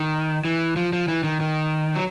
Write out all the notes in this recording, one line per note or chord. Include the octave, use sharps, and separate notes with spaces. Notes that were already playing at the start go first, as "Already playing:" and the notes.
Already playing: D#3
E3
F3
F3
E3
D#3
D#3
F#3